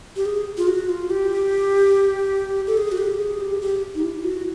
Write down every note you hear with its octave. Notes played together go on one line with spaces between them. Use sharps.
G4
G#4
F4
F#4
F4
G4
A4
G#4
F#4
G4
G#4
G4
G4
D#4
E4
F#4